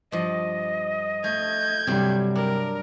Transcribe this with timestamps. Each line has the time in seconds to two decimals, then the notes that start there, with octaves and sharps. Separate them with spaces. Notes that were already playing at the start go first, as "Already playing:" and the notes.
0.12 G2 F3 D#5
1.24 A3 G6 G#6
1.87 G2 C3 F#3 G3
2.35 D4 A#4